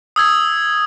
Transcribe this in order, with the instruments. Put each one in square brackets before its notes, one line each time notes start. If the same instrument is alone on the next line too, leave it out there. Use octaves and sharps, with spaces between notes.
[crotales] D#6 E6 G#6